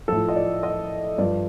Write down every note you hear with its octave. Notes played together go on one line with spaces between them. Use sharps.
A2 F3 A4
D#5
D5
D#5
G2 F3 D5